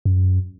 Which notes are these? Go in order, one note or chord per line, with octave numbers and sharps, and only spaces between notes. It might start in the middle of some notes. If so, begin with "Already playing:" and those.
F#2